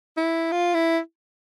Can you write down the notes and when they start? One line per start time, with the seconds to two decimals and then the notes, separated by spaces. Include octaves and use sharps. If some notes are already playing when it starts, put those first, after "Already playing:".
0.17 E4
0.51 F4
0.74 E4